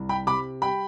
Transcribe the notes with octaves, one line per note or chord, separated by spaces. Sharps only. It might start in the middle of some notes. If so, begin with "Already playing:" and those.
Already playing: C2
G5 B5
C3 B5 D6
G3 G5 B5